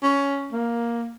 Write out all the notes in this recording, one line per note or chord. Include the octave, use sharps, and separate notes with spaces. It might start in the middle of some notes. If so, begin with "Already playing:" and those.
C#4
A#3